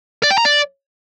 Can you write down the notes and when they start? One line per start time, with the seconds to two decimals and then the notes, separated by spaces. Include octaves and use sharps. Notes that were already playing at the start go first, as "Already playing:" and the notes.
0.23 D5
0.31 G5
0.38 A#5
0.45 D5